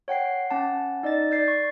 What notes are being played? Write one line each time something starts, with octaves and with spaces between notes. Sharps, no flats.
C#5 F#5 G5 C7
C#4 F#5 A5
D#4 D5 D#5 A6
D5 G6 A6 C7
C#6